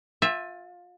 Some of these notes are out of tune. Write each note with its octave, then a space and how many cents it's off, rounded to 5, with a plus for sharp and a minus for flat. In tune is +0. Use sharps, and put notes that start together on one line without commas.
F4 +25 E5 +0 G#5 -45